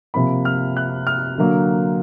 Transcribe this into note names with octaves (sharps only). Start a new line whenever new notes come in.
C3 F3 A#3 B5
F6
F#6
F6
D3 F#3 A#3